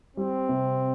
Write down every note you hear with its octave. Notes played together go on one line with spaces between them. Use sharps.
G3 C4
C3